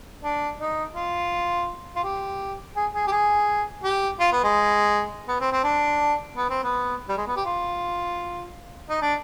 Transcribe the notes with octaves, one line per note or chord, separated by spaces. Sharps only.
D4
D#4
F4
F4
G4
G#4
G#4
G4
G#4
G4
F4
B3
G#3
B3
C4
C4
D4
B3
C4
B3
G3
G#3
B3
G4
F4
D#4
D4